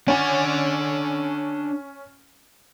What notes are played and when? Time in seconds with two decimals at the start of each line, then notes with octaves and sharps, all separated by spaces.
0.08 C#4 D4 F#5 G#5